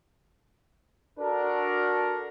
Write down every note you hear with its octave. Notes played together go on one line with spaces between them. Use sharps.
D4 F#4 A4 A#4